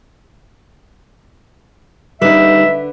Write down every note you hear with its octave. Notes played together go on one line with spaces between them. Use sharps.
D3 G3 D#4 B4 E5